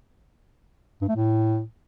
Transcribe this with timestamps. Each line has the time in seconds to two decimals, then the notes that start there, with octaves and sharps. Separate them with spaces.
1.01 G2
1.09 A3
1.16 A2